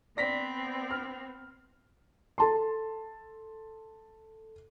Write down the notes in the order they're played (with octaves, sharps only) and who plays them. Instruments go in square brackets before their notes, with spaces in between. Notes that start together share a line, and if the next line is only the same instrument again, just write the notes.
[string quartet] B3 C4 [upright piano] D5 A#6 B6
[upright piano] F6
[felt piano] A4 A5 C6